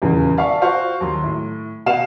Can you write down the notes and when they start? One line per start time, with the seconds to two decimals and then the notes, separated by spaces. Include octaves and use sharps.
0.02 D#1 E2 C#3
0.37 D5 E5 F5 A5 C#6
0.61 F4 F#4 C5 F5 C#6
1.01 D#2 D#3 F#3 C6
1.24 A2
1.86 B2 F5 F#5 E7